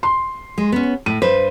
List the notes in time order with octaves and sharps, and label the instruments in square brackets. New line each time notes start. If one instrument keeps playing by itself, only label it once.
[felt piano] C6
[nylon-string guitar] G#3
B3 C#4
[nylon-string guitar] A2 [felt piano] D#7
[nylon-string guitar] G2 B4 [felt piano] C5